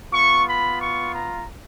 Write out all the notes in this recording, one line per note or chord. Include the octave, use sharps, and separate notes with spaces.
B3 F4 C#6
B5
C#6
A#5